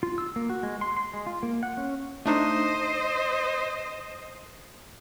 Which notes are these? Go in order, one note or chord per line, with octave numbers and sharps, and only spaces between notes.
F4
E6
A#3
F#4
G#3
C6
C6
G#3
F4
A#3
F#5
C#4
A3 D4 D#4 C5 D#5